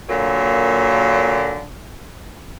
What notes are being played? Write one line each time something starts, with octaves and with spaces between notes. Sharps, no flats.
A#2 D3 F#3 A#3